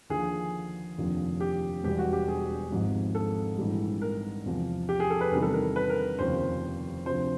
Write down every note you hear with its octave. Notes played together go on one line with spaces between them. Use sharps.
D#2 D3 F3 G#4
F1 D#2 D3 F3
G4
E1 E2 B2 G3 G4
F#4
G4
G#4
G#1 G#2 F3
A4
A#1 G#2 E3 G3
A#4
E2 C3 F3
G4
G#4
A4
B4
E2 C3 D#3 G3 A#4
A4
A#4
B4
A#4
F1 D#2 C#3 F3 C5
D2 C3 F3 C5